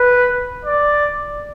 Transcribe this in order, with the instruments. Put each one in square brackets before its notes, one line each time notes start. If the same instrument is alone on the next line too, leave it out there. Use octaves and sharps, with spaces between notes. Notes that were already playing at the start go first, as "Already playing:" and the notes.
Already playing: [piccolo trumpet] B4
D5